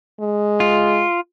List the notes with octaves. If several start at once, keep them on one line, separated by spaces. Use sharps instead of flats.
G#3
F4